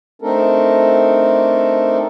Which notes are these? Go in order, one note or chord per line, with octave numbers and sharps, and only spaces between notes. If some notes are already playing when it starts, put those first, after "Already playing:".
A3 C4 D4 D#4 A4 A#4